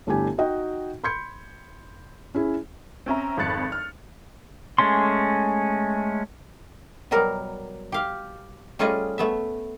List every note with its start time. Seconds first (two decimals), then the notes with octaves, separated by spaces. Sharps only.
0.07 G1 A3 D4 E4 G4 G#5
0.38 D#4 F#4 D#5 G5
1.04 B5 C6 G6 G#6 C#7
2.35 C#4 E4 G#4
3.06 C4 C#4 E5 A#5
3.37 G#1 F2 B5 F#6 A6 C#7
3.72 F6
4.78 G#3 A3 C#4 C6
7.11 B2 F#3 G3 A#4
7.92 G4 F5
8.79 G3 A3 C#4 F4 G#4 D#5
9.18 A3 B3 E5